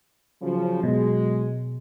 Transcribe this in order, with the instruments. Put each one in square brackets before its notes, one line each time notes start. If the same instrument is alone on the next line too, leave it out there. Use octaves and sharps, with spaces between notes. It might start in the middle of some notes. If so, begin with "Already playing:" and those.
[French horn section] C#3 F3 [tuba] F#3
[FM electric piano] B2 [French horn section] G#3